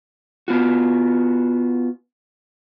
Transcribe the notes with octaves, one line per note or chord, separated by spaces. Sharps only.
B3 F4 F#4